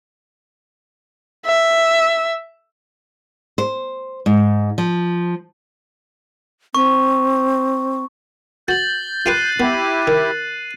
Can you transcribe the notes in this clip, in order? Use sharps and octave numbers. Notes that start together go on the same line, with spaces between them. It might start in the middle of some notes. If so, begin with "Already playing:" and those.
E5
C5
G#2
F3
C4 C#6
F#4 G6 A6 F#7
F4 G4 B4 F#6 C7 D#7
B3 E4 G4
D#3